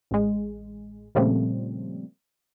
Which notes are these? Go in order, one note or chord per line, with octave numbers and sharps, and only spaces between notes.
A1 G#3
A#2 C#3 F3 G3 A3 C4